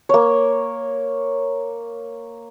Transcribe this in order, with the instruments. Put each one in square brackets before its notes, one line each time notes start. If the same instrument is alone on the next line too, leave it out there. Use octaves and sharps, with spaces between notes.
[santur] A#3 C#5